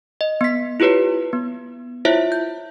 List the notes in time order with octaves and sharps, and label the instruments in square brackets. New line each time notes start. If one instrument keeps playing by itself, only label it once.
[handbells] D#5
B3 B6
E4 F4 G4 B4 C#5
B3
E4 F4 C5 C#5 E5
G6